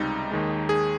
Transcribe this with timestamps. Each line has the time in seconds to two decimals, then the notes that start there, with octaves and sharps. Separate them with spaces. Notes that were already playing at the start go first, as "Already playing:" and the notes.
Already playing: C#2 C3 G3 D#4
0.31 D#2 D#3 G#3
0.69 G#4